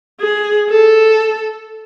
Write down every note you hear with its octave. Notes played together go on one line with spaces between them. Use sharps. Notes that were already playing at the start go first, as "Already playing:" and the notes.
G#4
A4